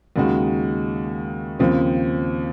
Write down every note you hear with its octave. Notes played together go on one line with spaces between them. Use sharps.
D#2 C#3 G#3 D#4 F#4
D#2 C#3 F3 C4